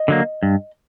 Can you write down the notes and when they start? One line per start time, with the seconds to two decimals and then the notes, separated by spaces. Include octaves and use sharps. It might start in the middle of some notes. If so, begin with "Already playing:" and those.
Already playing: D#5
0.08 D3 F#3 A#3
0.43 G2